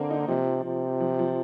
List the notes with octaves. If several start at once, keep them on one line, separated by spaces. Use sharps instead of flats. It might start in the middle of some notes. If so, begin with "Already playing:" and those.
Already playing: D3 A#3 C4
D#4
C3 F3
C3
F3
F3